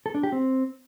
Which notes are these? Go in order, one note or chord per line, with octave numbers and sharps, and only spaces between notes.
A4
D4
G4
C4